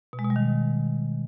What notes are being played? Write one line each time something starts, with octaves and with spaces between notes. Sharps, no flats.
B2
G#3
B2
G3
D#3